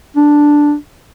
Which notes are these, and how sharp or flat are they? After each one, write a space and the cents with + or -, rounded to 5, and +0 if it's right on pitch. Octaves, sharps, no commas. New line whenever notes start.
D4 +0